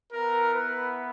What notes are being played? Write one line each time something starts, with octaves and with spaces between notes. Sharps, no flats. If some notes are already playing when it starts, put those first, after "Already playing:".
B3 E4 A#4
B4